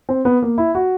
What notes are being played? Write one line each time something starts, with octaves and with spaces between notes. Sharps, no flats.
C4
B3
A#3
E4
F#4